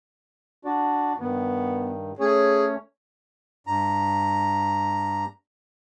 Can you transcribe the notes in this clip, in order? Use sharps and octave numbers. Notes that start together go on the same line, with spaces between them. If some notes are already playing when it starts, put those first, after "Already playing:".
D4 F#4 D5
G2 D#3 B3
A3 C#4 G#4 C#5
G2 A#5